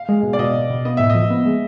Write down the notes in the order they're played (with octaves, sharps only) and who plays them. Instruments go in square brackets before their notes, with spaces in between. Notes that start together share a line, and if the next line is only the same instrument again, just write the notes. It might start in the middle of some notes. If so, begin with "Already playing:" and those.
Already playing: [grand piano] F5
[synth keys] G#3
B2
[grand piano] D5
[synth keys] B2 [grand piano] D#5
[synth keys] B2
B2
[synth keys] B3 [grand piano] D#5
[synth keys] A2 [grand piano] E5
[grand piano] D#5
[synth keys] F3
B3
G#3